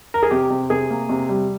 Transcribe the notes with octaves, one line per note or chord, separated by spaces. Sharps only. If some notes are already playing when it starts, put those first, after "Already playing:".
A#4
G#4
C3 G4
C3
C3 G#4
A#3
C3
G3